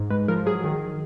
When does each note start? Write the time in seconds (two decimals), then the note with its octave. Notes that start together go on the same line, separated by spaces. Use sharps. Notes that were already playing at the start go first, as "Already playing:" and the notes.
Already playing: G#2
0.10 G#3 B4
0.28 F3 A#4
0.46 F#3 G#4
0.64 D#3